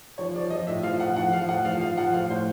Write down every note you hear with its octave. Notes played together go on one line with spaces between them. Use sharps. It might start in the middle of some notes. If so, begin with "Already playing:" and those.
F3 C#5
F3 D5
F3 D#5
A2 E5
F3 F5
A2 F#5
F3 F#5
F3 F5
A2 F#5
F3 F5
F3 F5
F3 F#5
A2 F5
A2 C5